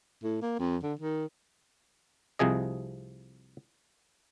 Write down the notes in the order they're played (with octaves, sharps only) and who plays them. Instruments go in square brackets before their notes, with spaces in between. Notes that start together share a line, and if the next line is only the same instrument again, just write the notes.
[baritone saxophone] A2
A#3
F2
D3
D#3
[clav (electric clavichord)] C2 C3 F3 G#4 D#5